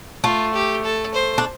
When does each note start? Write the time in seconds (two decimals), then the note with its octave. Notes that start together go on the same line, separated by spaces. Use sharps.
0.24 A3 F4
0.54 G4
0.84 A4
1.14 C5
1.38 D4